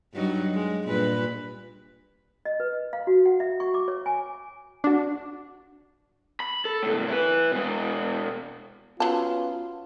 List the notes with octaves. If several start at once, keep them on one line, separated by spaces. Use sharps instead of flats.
G2 F#3 D#4
G#3
G2 A#2 B4
D#5
B4
F5
F#4
F#5
E5
C#6
D6
C#5
G#5
D4 F#4
B5
A4
C#2 A2
E4 B4
B2 G#3
F#3 B3 C#4 F4 A5